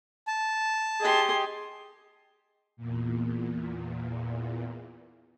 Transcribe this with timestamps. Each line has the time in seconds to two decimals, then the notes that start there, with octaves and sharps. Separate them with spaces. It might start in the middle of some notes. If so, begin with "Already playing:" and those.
0.27 A5
1.01 G4 G#4 D#5 C6
2.77 E2 A#2